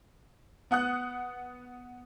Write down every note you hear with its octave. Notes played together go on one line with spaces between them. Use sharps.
B3 F#5 D#6 F#6